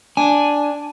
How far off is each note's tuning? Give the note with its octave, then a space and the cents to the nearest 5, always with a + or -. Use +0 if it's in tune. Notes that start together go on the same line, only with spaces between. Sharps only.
D4 +0 G#5 +0